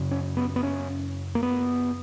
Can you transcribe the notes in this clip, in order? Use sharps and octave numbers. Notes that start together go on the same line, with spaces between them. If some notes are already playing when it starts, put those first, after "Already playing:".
Already playing: F#2 C#3
C#4
B3
B3
C#4
A#3
B3